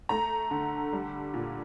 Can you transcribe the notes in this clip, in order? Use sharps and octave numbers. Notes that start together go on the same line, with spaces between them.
A3 A#5
D3
G3
A#2